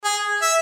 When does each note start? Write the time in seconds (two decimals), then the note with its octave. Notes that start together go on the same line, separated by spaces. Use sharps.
0.04 G#4
0.42 E5